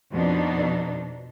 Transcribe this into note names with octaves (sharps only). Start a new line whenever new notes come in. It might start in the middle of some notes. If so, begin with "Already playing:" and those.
F2 B2 D4 D#4